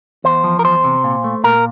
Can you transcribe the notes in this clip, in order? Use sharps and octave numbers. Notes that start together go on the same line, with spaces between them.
E2 C5
F3
A#4
E2 C5
C3
A#2
A3
A#2 A#4